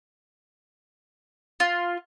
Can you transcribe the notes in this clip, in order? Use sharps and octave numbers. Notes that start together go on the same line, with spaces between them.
F4